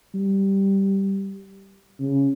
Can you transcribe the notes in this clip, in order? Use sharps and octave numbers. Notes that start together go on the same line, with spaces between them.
G3
C#3